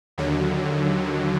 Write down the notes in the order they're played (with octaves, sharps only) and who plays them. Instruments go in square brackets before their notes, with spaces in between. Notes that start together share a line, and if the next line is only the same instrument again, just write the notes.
[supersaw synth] D#2 D3 F#3